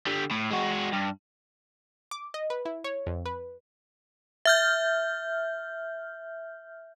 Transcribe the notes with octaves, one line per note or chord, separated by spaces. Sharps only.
D3 G3
A2
G#3 F#4
G2
D6
D#5
B4
E4
C#5
F2
B4
E5 F6 G6